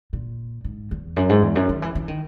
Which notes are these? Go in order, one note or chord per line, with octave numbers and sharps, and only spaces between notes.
A#2
G#2
E2
F#2
G#2
E2
F#2
D#3
E3
E3
D#3